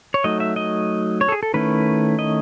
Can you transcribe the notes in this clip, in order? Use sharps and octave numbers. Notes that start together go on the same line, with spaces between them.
C#5
F#3 A3 D#4 D#5
E5
D#5
C#5
A4
G#4
A4
D#3 A3 C#4 E4 B4
D#5